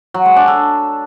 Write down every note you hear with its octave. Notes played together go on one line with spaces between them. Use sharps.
F#3
G#3
D4
A4